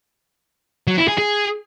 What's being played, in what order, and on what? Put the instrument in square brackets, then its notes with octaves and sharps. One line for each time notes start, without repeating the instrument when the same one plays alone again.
[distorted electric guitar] F#3
E4
G#4
G#4